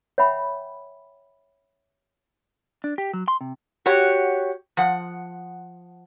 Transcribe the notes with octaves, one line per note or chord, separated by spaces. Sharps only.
C#5 E5 F#5 G5 B5
D4
G4
F#3
C6
C3
F#4 G4 C#5
F3 F#5